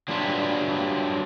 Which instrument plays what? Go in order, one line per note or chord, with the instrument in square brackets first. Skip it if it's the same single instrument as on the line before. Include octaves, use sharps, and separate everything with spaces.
[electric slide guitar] F#3 G3 D4 F4 B4